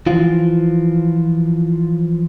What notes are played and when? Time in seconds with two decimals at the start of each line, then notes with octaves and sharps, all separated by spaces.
0.06 E3 F3 F4